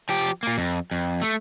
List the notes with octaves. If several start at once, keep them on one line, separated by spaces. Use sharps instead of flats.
F3 G4
A#2 A#3
F2
F2
A3